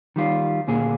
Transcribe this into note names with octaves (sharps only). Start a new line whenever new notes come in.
D#3 G3 F4
D2 A#2 G#4